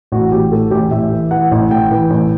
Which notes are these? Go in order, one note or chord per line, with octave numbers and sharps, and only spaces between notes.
A1 F#4
A1 G4
A2 A4
A1 G4
A1 E5
E3
E3 F#5
A1
A1 G5
E3
A1